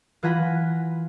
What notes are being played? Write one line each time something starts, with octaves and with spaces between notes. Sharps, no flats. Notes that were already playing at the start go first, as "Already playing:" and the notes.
E3 F4 F#5 G#5 A#5 B5